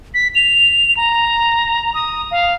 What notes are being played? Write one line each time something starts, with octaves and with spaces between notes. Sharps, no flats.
B6
F7
A#5
D#6
F5